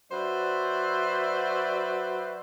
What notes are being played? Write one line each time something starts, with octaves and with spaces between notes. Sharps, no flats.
F#3 F#4 B4 C5 D5 E5